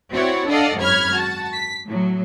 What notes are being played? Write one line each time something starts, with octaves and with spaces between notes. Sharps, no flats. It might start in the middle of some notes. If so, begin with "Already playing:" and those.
C4 E4 F#4 C#5 D5 F#5
D4 A4 D5 D#5 F5 F#5
G#1 F#2 C#5 B5 F6 G#6
F#4 A5
B6
A2 F#3